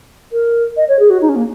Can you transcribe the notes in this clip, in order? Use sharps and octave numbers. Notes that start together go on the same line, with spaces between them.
A#4
D#5
C#5
G#4
F#4
D#4
C#4
A#3